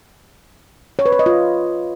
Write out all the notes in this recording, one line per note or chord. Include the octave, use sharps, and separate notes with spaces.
C#5
B4
C#5
D#5
F4